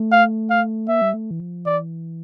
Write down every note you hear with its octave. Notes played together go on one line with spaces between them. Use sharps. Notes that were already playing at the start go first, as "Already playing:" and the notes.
Already playing: A3
F5
F5
A#3 E5
G3
A3
E3
F3
E3 D5